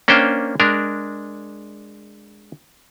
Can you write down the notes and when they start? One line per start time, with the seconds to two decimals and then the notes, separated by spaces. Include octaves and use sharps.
0.08 A#3 C#4 D4 C5 G5
0.60 G#3 D4 A#4